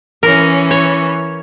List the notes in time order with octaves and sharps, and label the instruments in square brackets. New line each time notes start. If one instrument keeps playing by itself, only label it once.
[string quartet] E3 C#4 [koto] A#4
[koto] C#5